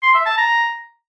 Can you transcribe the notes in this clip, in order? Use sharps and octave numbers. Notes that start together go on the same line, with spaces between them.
C6
E5
A5
A#5